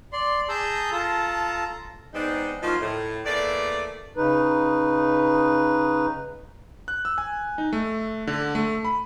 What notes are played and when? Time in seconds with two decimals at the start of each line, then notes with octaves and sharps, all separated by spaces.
0.13 D5 C6
0.49 G#4 A5 A#5 E6 G6
0.92 F4 A4 A5 A#5
2.14 G#3 B3 C4 D4 D#4
2.62 F3 F#3 A#3 C#4 D#4 F4
2.80 A2
3.25 E2 A3 A#3 D5
4.17 C#3 D#4 B4
6.88 F#6
7.05 E6
7.18 G#5
7.58 D#4
7.73 A3
8.27 D3
8.55 A3
8.85 B5